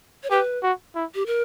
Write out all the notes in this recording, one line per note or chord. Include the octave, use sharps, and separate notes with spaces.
C#5
G4 B4
F#4
E4
G4
A#4